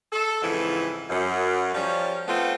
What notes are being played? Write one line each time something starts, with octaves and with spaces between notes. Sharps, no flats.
A4
F2 G#2 C#3 E3
F#2
F3 G3 C#4
A3 B3 C4 F4